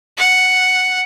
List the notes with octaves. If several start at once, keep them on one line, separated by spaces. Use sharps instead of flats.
F#5